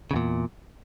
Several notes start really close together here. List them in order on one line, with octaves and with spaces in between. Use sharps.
C#3 E2 A#2